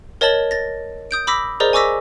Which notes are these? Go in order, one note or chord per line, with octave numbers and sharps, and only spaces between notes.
A#4 C#5 D#5 A5 A6 F#7
A6 A#6
D#6 G6 D7
B5 D6 E6 A#6 B6
G#4 A#4 C5 D5 D#5 A#5
G#5 C#6 D6 E6 A#6 B6